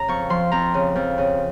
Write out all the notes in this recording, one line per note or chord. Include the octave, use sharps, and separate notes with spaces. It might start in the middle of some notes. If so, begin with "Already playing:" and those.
Already playing: C#3 A#5
F2 C#6
F3 C6
F2 A#5
C#3
F2
C#3